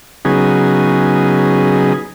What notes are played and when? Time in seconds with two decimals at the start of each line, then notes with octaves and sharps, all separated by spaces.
0.25 C#3 F#3 B3 D#4 G#4